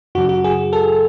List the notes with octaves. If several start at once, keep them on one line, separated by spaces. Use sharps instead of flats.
F#2 C#3 F#3 F#4
F#4
G#4
A4